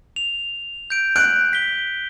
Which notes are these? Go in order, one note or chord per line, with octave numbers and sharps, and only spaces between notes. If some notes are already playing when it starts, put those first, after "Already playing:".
F7
G6 D7
F#6 D7
B6 G7